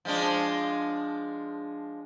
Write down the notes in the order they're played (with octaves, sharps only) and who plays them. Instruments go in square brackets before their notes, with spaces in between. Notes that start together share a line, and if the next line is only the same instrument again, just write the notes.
[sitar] F3 G#3 D4